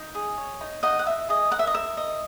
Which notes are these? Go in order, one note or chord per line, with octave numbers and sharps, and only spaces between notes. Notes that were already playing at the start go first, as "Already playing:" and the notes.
Already playing: D#4
G#4
C#5
D#4
D#4 D#5 F#5
F#5
D#4 E5
G#4 D#5
A#4 F#5
E5
D#5
A#4 E5
D#5